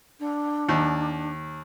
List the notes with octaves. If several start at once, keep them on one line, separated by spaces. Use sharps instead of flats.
D4
D#2